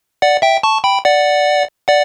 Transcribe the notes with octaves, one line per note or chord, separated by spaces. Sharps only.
D5 F#5
E5 G5
A5 C#6
G5 B5
D5 F#5
D5 F#5